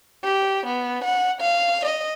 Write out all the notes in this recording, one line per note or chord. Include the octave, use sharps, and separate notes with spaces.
G4
B3
F#5
F5
D#5